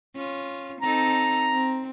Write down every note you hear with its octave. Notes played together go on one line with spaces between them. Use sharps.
C#4 F4
C4 D#4 A4 A#5
C4